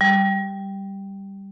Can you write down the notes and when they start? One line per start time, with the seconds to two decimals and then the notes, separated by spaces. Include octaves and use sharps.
0.01 G3